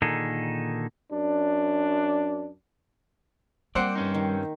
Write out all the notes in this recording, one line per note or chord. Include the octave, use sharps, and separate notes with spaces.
A#2 D3 D#3 D#4 G#4 A4
F#2 D4
G3 A#3 C4 C5 D5 F#5
G2 C#4 D#4
D#3